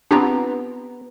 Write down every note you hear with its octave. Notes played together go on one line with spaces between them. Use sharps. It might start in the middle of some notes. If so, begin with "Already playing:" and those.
B3 C4 D4 F4 G4 A#5